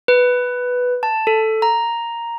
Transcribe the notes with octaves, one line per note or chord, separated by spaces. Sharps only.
B4
A5
A4
A#5